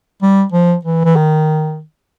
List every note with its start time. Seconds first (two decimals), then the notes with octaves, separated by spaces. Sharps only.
0.22 G3
0.52 F3
0.85 E3
1.05 E3
1.16 D#3